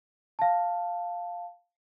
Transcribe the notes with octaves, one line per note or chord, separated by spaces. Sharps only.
F5 A5